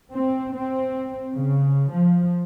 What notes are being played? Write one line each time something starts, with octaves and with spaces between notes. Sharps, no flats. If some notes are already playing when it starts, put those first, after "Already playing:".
C4
C4
C#3
F3